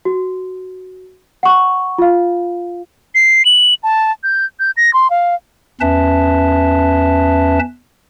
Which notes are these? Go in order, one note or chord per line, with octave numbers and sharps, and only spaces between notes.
F#4
F#5 C#6
F4 F5
C7
F#7
A5
G6
G6
A#6
C6
F5
E2 C#4 B4 E5 A5